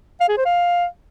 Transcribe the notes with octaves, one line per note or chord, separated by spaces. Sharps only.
F5
G#4
C5
F5